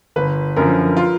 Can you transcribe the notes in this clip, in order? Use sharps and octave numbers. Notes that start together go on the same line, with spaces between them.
G1 B4
F#2 D3 F3 A#4
F4